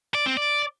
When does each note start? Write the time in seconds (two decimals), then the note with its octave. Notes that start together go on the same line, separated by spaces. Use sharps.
0.15 D5
0.26 C4
0.37 D5